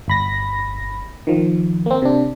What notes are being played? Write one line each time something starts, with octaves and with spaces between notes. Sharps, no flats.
G1 B5 A#6
D#3 F3
A#3 C4
C3 D4